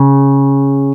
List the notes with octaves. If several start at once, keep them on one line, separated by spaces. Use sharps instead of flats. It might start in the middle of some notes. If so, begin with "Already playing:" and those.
Already playing: C#3